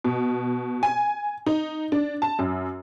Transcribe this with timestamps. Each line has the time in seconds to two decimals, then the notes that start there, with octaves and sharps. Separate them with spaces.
0.04 B2
0.83 G#5
1.46 D#4
1.92 D4
2.22 A5
2.39 F#2